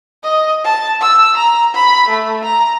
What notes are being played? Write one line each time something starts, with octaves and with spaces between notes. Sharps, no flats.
D#5
A5
E6
A#5
B5
A3
A#5